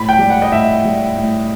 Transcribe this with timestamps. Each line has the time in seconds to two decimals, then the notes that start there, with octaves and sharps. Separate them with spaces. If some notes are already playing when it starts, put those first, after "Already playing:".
Already playing: A2 B5
0.09 G5
0.19 G3
0.30 F#5
0.42 D#5
0.52 A2 E5
0.85 G3
1.17 A2